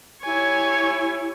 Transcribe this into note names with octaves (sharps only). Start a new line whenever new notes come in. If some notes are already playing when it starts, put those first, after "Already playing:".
E4 G4 C#5 G#5